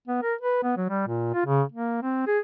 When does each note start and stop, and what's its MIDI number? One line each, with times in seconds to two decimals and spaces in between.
0.08 0.20 59
0.23 0.34 70
0.41 0.58 71
0.63 0.74 59
0.77 0.85 54
0.89 1.04 55
1.07 1.31 46
1.34 1.46 65
1.46 1.62 49
1.72 2.01 58
2.03 2.24 60
2.27 2.39 68